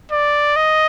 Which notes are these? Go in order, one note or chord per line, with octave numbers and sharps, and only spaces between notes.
D5
D#5